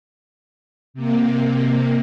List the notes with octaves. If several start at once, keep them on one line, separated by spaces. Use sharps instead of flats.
C3 A#3